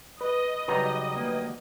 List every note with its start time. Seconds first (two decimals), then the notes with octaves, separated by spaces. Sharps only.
0.21 B4 D#5
0.68 C#3 F#3 G3 D#4 B4 A#5
1.16 D2 A#3